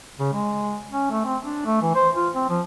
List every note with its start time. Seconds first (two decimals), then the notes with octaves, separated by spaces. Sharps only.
0.20 C#3
0.33 G#3
0.91 C#4
1.10 A3
1.25 C4
1.43 D4
1.66 A3
1.82 E3
1.95 C5
2.16 F4
2.35 C4
2.49 F3